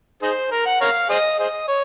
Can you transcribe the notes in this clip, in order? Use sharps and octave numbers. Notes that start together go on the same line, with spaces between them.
D#4 G#4 C5
A#4
F#5
A#4 C#5 F5
G#4 C5 D#5
G#4 C5 D#5
C#5